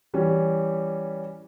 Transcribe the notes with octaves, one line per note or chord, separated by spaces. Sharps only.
E3 G3 C#4 G4